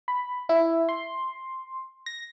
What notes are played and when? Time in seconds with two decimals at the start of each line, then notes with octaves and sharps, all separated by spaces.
0.08 B5
0.49 E4
0.89 C6
2.06 A#6